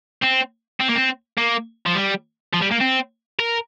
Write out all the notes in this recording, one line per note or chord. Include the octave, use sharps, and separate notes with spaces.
C4
C4
A#3
C4
A#3
F3
G3
F3
G3
A#3
C4
A#4